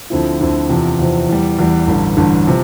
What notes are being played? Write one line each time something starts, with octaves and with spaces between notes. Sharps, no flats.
D2 D3 F3 C4 E4
D2 D3 F3 C4 E4
E2 C3 F3
E2 C3 F3
E2 E3 G3
E2 E3 G3
A1 G2 D3
A1 G2 D3
C3 F3